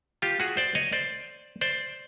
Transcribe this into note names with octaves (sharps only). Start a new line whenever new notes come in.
F4 G4
F#4 G#4
C5 D5
C#5 D#5
C5 D5
C5 D5